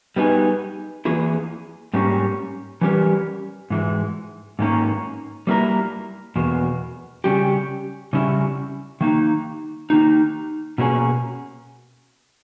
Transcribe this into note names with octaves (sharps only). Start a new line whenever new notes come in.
G3 B3 D#4 G#4
E3 A#3 E4 G#4
G#2 G3 A#3 C#4
E3 G3 C#4 G4 A#4
G#2 E3 G#3
G#2 D#3 A#3 C#4
G3 A#3 E4 A#4
E2 B2 A#3
C#3 G3 C#4 G4
C#3 G3 C#4 E4
D#3 A#3 D#4
D#3 A#3 D#4
B2 A#3 C#4 G#4